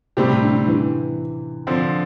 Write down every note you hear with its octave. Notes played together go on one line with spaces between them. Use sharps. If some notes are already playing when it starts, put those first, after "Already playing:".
A2 C3 G3 C4 G4
D3
E3
D3 F3 C4